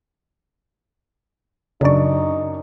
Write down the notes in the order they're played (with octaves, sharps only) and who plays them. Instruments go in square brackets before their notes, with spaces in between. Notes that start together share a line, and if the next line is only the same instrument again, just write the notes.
[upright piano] F#2 D4 C#6 [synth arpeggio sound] C#3 D5 [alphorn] D#4